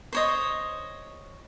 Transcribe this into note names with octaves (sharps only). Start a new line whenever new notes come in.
C5 C#5 D#5